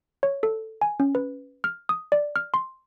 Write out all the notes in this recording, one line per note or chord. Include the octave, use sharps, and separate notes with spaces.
C#5
A4
G#5
C#4
B4
F6
D#6
D5
F6
C6